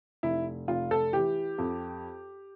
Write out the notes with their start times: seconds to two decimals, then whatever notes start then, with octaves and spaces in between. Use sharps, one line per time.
0.23 F1 E4
0.68 F1 F4
0.91 A4
1.13 E3 G4
1.58 F2